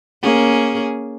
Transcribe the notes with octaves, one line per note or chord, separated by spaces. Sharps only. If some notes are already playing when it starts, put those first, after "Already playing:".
A#3 C#4 G#4